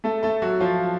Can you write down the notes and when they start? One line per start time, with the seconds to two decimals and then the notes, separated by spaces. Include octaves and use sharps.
0.04 A3 A4
0.23 A3 A4
0.42 F#3 F#4
0.61 F3 F4